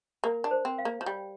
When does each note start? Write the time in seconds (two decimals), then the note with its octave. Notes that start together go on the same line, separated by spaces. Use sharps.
0.24 A#3 A#4
0.44 D4
0.51 C5
0.65 C4
0.78 F5
0.85 A#3
1.01 F3
1.06 G3 G5